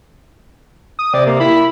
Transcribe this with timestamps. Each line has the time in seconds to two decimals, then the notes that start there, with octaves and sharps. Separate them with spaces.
0.99 D#6
1.14 C3 D5
1.26 A#3
1.40 E4 B5